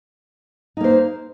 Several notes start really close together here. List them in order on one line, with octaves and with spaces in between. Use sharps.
D#4 A#3 C5